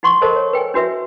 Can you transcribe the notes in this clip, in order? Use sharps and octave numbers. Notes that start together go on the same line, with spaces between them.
D#4 F#5 C6 C#6
A4 A#4 C5 D#5 A5
C#5
B4 G5 G#5
D4 F#4 B4 E5